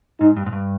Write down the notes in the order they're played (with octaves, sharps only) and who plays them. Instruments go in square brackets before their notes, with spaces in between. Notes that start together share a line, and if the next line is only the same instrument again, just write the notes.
[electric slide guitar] G#2 [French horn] D#4
[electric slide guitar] G2
G#2
G2